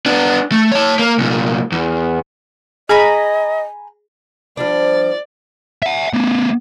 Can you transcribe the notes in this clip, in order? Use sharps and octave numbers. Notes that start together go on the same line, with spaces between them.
B3 D4
A3
C#5 A5
A#3
C2 A#2
E2
G#4 D#5 G#5 A#5 B5
F3 G3 D4 D5
E5 F#5
A3 B3